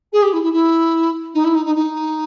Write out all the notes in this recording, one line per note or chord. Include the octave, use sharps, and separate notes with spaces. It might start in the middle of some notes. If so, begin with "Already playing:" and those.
G#4
G4
E4
E4
E4
D#4
E4
D#4
D#4
D#4